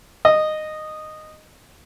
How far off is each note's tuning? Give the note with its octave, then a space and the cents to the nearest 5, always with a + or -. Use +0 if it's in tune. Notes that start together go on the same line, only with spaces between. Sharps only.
D#5 -10